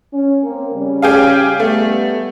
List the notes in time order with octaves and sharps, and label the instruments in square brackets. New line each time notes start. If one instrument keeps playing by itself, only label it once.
[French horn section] C#4
A#3 C4
C#3 G3 C#4
[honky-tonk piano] G4 G#4 F5
[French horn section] G3 B3 [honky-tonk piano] A3